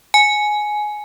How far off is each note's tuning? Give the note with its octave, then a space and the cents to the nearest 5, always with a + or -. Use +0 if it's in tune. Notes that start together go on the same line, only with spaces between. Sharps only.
G#5 +15